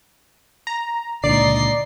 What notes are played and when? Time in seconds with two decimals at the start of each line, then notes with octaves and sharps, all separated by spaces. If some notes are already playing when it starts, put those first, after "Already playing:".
0.67 A#5
1.24 C#2 A#2 D3 D#4 D5 C7